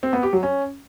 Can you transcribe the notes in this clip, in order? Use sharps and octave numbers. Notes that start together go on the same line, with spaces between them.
C4
B3
G4
F#3
C#4